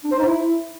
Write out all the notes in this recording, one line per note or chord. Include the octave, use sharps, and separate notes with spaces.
D4
C5
D#4
E4